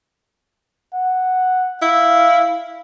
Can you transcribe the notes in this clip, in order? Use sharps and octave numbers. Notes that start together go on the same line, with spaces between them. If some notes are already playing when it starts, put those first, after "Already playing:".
F#5
E4 F5